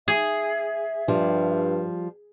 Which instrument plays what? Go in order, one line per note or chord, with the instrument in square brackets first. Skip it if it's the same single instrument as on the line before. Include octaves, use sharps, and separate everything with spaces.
[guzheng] G#4 [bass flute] E5
[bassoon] G2 [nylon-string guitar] F3 G3